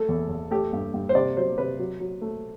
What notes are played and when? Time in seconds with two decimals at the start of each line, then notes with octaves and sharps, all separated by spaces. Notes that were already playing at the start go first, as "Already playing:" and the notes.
Already playing: A3 A4
0.09 E2
0.29 E2
0.51 A3 G4
0.73 G2
0.94 G2
1.09 C5
1.15 C3 D5
1.37 F#3 C5
1.58 C3 B4
1.79 F#3
2.00 F#3
2.22 A3